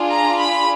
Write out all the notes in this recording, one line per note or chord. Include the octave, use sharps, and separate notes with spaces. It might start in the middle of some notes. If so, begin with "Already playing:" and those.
Already playing: D4 F4 G#4
A#5
B5